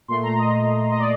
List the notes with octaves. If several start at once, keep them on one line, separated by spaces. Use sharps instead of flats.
A#2 A3 C6
A#5
D#5
D#5
D5